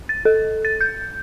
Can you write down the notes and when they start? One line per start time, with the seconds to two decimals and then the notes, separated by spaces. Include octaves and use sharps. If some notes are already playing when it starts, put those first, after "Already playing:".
0.09 A6
0.25 A4
0.65 A6
0.81 G6